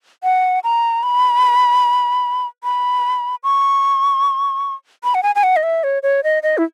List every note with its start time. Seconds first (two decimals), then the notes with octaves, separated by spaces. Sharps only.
0.23 F#5
0.64 A#5
1.03 B5
2.64 B5
3.43 C#6
5.04 B5
5.15 F#5
5.23 G#5
5.35 G#5
5.43 F#5
5.56 D#5
5.63 E5
5.84 C#5
6.03 C#5
6.24 D#5
6.43 D#5
6.58 E4